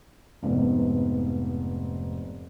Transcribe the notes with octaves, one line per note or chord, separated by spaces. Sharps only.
F1 G#2 B3